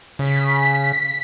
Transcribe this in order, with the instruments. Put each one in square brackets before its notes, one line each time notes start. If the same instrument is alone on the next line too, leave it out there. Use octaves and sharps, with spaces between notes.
[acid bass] C#3 [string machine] B6